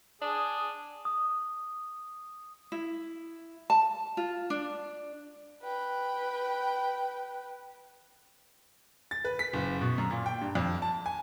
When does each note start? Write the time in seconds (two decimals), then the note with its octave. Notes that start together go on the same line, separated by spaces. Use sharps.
0.22 D4 G#4 D#6
1.05 D#6
2.72 E4
3.70 A5
4.17 F4
4.50 D4
5.63 B4 G5
9.11 A6
9.25 B4
9.39 B6
9.53 F#1
9.81 B2
9.98 F#2
10.11 A#2
10.26 G5
10.41 G2
10.55 F2
10.82 A5
11.06 G#5